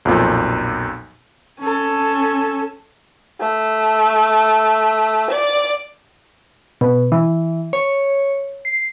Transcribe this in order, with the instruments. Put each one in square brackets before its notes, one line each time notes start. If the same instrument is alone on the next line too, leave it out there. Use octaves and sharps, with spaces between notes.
[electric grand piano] B1 F2 A#2
[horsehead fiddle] C#4 A4
[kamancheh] A3
D5
[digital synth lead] B2
E3
C#5
C7